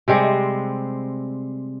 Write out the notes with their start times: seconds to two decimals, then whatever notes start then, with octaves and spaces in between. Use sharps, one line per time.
0.08 C3 G3 G#3 C4